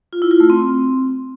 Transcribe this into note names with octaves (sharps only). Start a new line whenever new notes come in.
F4
E4
F4
A3
C4